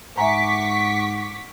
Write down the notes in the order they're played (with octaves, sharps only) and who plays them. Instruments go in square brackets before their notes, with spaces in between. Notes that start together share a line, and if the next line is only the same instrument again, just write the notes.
[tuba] G#2 [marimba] E5 G#5 A#5 [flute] F#5 [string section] C#6 D6 B6